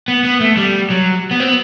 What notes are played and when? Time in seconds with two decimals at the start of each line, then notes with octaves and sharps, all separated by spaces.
0.08 B3
0.25 B3
0.41 A3
0.57 G3
0.90 F#3
1.31 B3
1.40 C4
1.48 B3